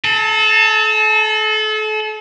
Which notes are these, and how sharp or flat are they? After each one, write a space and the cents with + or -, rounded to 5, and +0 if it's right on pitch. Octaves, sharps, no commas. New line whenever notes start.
A4 -35 A5 +35